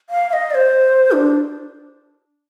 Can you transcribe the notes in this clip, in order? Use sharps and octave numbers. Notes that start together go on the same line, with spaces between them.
F5
F5
D#5
D5
C5
D4